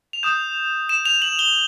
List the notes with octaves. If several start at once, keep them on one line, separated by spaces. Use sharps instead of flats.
F7
D#6 G6 E7
E7
F7
F#7
G7